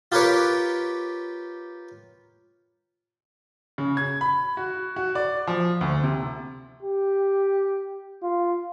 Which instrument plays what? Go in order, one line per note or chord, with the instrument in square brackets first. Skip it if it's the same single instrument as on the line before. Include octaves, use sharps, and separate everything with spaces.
[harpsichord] F4 G4 A#4 B4 C#5 D6
[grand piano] C#3
G#6
B5
F#4
F#4
D5
F3
D2
C3
[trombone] G4
F4